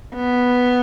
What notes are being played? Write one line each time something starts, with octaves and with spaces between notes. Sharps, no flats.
B3